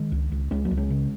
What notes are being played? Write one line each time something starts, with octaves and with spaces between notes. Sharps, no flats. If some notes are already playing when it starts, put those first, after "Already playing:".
Already playing: D#3 G#3
C#2
C#2
C#2 G#3 C#4
F#3 A#3
C#2
G#3 C#4
C#3